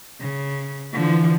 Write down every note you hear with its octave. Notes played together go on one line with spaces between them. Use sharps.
C#3
D3 E3 F3